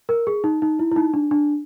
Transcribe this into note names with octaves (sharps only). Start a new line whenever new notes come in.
A#4
G#4
D#4
D#4
E4
E4
D#4
D4
D4